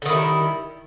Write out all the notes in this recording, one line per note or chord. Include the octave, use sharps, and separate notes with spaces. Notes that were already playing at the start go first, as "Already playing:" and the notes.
D3 D#3 G3 E4